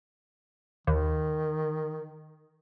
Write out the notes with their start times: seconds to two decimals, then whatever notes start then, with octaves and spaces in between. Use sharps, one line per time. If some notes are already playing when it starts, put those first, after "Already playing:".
0.87 D#2 D#3